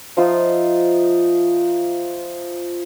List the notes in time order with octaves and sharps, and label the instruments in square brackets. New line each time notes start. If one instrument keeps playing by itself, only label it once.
[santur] F3 D#4 F4 E5